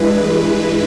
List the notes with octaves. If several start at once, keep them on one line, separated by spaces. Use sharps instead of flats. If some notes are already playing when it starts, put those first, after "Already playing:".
Already playing: G2 E3 G#3 B4